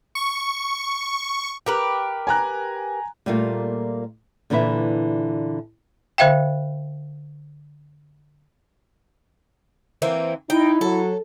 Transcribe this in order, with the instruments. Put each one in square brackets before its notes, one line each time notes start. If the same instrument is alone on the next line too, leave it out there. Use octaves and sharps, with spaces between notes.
[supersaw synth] C#6
[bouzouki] G4 A#4 B4
[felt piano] G#5 A#5 F#6
[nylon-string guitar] A#2 G3 A3 A#3 F4
A#2 D3 E3 E4 B4 E5
[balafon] D3 C5 E5 F5 G5
[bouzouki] E3 A#3 C4
[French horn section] D#4 [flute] E4 [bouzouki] G5
[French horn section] F#3 [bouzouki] A4